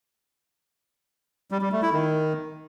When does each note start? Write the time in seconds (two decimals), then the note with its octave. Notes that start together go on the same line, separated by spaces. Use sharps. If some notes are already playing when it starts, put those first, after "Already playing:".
1.51 G3
1.62 G3
1.72 A3
1.82 E4
1.93 D#3